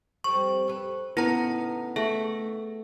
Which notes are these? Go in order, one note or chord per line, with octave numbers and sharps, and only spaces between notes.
F2 G3 C#6
A4 B4
A2 C#3 B3 D#4 E4 A#5
A3 G#4